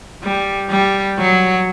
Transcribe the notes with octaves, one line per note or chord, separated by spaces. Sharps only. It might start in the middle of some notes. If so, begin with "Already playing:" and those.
G3
G3
F#3